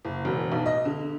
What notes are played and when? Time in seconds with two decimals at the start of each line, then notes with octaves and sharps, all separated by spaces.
0.05 F#1
0.25 E1
0.52 B1
0.66 D#5
0.85 D3